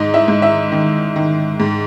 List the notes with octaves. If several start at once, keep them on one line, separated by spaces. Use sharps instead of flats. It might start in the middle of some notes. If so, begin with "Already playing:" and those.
Already playing: G#2 D#4 D#5
E4 E5
G#2
E4 E5
D#3
D#3
G#2